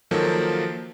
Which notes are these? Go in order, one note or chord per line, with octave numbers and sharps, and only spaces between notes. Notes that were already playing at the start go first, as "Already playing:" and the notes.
D#3 F3 F#3 A#3 A4